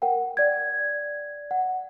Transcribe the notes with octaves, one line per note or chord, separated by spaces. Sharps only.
A#4 F#5 G5
D5 G#6
F#5